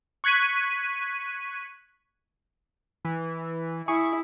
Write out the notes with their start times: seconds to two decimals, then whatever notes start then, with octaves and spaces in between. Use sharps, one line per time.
0.24 C#6 F#6 G#6 B6 D#7
3.05 E3
3.88 E4 G#4 C#6